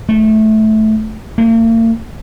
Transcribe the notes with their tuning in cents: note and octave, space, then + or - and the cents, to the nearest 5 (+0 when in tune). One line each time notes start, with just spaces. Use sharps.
A3 -15
A#3 -45